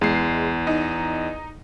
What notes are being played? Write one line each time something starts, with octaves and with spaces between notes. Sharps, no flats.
E2 G#3 C7
D#4